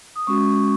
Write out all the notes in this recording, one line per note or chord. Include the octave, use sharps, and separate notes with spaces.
D#6
G#3 C#4 F#4 C#6